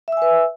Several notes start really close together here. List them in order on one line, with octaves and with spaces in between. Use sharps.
E5 E6 G#5 B4